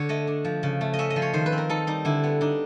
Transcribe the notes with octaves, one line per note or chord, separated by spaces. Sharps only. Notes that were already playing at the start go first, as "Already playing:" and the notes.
Already playing: D3 C#5
A3 D#5
D4
F3
C#3
A3
D#5
C#4 E5
D#5
F3
C#5
D#3 C5
B4
C4
A#4
D#4 A4
G3 D#4
D3 E4
B3
D4 D#4